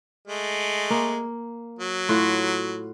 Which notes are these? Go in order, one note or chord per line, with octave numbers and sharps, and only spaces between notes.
G#3 A3
A#3
F#3
A2 F4 F#4